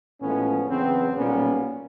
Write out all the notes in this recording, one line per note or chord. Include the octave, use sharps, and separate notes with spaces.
A1 A2 F3 G#3 B3 C#4
E2 C#3 F#3 B3 C4
B1 A#2 G3 A#3 B3 C#4